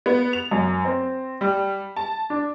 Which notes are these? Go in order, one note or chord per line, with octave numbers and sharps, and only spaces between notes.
B3
F7
F#2
C4
G3
A5
D4